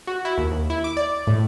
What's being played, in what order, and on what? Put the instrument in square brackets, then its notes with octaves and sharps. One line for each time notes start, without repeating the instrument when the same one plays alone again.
[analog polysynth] F#4
E4
D#2
D#2
E4
D6
D5
A2